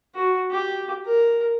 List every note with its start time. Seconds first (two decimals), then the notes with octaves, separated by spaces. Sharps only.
0.15 F#4
0.51 G4
1.05 A#4